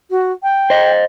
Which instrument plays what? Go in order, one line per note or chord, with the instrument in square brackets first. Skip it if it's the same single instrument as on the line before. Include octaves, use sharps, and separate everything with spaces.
[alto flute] F#4
G5
[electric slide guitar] C5 D#5